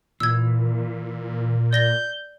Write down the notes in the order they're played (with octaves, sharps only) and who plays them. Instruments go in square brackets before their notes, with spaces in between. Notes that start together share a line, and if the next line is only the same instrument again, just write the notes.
[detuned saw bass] A#2 [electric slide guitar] E3 [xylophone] E6 G#6
[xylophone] D5 A#6 G7 [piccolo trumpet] G6